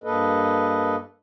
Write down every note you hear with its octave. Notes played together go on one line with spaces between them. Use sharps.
G2 A#3 A4 B4 D#5